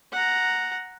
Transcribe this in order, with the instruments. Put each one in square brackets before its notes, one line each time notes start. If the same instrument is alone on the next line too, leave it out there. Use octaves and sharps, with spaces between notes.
[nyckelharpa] F#5 A#5